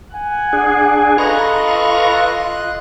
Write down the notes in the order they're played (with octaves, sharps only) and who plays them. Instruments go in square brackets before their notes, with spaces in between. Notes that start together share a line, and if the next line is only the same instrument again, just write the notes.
[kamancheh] F#5 [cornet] G#5
[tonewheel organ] D4 G#4
[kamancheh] F4 A4 [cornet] B4 [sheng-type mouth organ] D#5 C6 F#6 [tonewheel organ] A#5 C#6